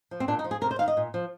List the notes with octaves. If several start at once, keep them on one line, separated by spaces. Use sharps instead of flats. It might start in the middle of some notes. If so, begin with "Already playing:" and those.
F3
C4
A#2 D4
D#4
F3
G#4
C3 A#4
C5
D#3 F5
D#5
A#2
F3